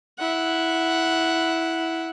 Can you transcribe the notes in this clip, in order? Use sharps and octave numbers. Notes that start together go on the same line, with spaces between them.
E4 F#5